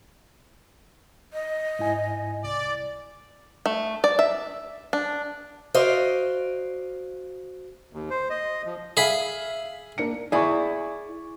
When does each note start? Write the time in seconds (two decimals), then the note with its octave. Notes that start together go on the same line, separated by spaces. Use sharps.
1.33 D#5
1.79 G#2 E4 G#5
2.44 C2 D5
3.66 A3
4.04 D5
4.19 E5
4.93 D4
5.74 F#4 C5 D5 D#5 F5
7.93 D#2
8.10 C5
8.30 D#5
8.66 F3
8.97 G#4 E5 F5 B5
9.98 A#3 D4 C#7
10.32 E4 G#4 D5 C#6